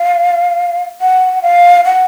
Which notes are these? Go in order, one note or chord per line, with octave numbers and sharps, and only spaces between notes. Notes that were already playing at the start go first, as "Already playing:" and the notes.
Already playing: F5
F#5
F5
F#5